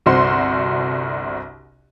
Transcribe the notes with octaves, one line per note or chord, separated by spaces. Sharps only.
G1 C2 F#4 C5 C6